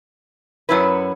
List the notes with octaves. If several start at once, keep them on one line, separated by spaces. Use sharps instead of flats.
F#2 F#3 C#4 E4 B4